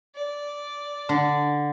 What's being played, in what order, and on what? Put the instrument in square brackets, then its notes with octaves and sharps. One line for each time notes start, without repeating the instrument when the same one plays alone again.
[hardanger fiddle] D5
[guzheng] D3